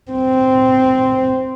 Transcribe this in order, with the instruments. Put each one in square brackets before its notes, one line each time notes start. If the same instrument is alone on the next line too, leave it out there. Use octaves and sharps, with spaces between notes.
[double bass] C4